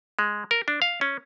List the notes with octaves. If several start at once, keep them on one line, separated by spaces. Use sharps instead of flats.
G#3
A#4
D4
F5
C#4